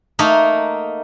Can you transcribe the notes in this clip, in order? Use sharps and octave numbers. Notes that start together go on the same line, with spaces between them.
A3 A#3 D#4